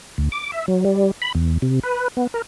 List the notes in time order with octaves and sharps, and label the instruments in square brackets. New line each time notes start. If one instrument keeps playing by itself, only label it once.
[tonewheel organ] D2
D6
E5
F#3
G3
B5
E2
C3
B4
B3
A#4